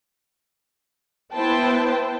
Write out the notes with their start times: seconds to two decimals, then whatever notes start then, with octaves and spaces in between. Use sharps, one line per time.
1.32 B3 E4 B4 C5 G5 A5